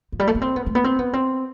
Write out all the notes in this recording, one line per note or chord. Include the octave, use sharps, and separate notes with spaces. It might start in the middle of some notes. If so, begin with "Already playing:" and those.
F3
G3
A3
B3
C4
B3
A3
B3
C4
B3
C4